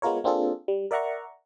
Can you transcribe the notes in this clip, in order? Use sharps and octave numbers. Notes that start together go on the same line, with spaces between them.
G#3 B3 F4 A#4 C#5
A#3 C4 D4 F4 G#4 A4
G3
A#4 D5 E5 F#5 A#5 C#6